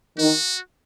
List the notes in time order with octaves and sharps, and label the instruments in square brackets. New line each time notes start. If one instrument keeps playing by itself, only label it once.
[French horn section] D#3 [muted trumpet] F#4